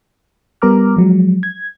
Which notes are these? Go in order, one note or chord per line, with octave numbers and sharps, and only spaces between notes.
G3 B3 A#4 A#5 D6 F6
F3 F#3 G#3
G#6